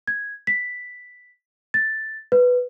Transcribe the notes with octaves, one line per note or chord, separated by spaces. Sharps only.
G#6
B6
A6
B4